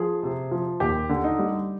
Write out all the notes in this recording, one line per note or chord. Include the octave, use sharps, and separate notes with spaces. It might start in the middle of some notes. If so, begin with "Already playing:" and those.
Already playing: F3 G#4
C3
F3
D#2 G4
D3
D#4
G3